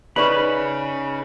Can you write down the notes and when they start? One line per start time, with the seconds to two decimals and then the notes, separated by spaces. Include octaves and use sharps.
0.16 C#3 C#4 D#4 G#4 B4 D5 B5 C#6